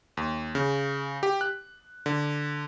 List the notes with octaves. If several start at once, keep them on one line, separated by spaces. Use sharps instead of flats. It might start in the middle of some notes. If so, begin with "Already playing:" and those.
D#2
C#3
G4
F#6
D3